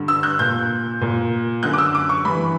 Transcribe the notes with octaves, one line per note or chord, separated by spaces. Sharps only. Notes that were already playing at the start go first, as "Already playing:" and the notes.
Already playing: G2 D3
E6
F#6
A#2 G6
A#2
F#2 D3 F#6
D6
E6
D6
C#6
G2 E3 B5